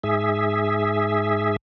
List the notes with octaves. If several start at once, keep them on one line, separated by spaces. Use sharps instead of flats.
G#2 G#4 E5